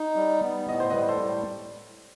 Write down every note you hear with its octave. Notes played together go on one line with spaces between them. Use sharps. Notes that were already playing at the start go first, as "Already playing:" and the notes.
Already playing: D#4
G3
B3
A2 D#5
C5
G3 B4 D#5
A4 C5
A2